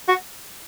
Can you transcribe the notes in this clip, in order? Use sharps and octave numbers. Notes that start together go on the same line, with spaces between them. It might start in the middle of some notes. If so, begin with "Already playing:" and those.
F#4